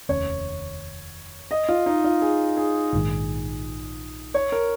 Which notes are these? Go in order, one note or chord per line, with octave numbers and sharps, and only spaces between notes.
F1 D#2 D#3 C#4 C#5
D#5
F4
D#4
F4
G#4
G#4
A#1 G#2 D#3
C#5
A#4